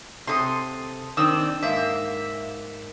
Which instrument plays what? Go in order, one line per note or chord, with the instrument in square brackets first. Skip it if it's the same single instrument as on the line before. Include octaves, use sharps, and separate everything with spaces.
[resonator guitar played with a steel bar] C3 A4 [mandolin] C6 D#6
[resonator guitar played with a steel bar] D#3 C4 D4 [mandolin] D#6 E6
[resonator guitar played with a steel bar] G#2 A#3 [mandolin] E5